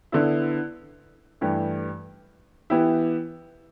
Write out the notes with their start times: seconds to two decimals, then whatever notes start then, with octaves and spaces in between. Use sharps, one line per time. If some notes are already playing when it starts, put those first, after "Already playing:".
0.12 D3 B3 E4
1.41 G2 E3 A3 G4
2.70 E3 B3 E4 G4